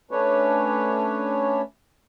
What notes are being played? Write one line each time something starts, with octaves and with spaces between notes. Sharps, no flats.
A3 C#4 D4 B4 C#5